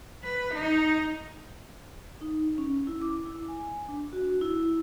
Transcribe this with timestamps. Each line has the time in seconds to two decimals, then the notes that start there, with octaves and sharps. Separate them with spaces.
0.24 B4
0.54 D#4
2.21 D#4
2.58 C#4
2.87 E4
3.02 D6
3.25 E4
3.48 G#5
3.89 D4
4.13 F#4
4.41 E4